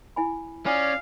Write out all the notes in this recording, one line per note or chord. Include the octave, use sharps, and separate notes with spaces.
E4 G#5 B5
C#4 F4 D5 F5 G#5 D#6